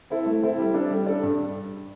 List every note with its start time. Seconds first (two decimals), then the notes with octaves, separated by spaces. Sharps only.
0.10 C4 E4 A4
0.26 A3
0.42 C4 E4 A4
0.58 G3
0.74 D4 A4 D5
0.91 G3
1.06 D4 A4 D5
1.23 G2